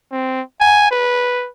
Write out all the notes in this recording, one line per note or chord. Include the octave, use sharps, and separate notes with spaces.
C4
G#5
B4